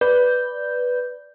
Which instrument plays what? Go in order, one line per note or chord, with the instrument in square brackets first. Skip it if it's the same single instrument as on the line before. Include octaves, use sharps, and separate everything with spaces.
[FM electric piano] B4 D5 G6